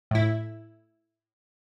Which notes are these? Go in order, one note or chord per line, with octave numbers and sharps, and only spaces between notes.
A2 E4